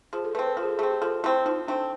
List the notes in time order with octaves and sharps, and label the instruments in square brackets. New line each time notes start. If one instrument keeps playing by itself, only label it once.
[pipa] F3 [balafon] G#4
[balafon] A4
[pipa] A3 [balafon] B4
[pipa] C4
[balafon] B4
[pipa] F3 [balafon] A#4
[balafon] G#4
A4
[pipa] A3 C4 [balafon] G#4
[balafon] G4
[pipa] F3 [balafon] A4
[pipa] A3 C4 [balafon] E4
[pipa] F3 [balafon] D#4
[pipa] A3 C4 [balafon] D4